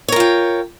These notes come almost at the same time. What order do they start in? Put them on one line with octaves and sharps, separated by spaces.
C#5 A#4 F4 G5